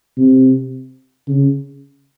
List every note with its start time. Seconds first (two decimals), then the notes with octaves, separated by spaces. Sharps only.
0.18 C3
1.28 C#3